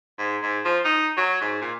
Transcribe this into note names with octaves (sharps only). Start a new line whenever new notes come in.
G#2
G#2
F3
D#4
F#3
G#2
A#2